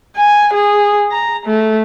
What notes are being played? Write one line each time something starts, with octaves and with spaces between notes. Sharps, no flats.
G#5
G#4
A#5
A3